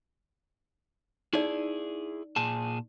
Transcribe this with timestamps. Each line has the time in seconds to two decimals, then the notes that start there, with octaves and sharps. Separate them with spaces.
1.33 D#4 E4 G#4 D5
2.36 A#2 G#4 A5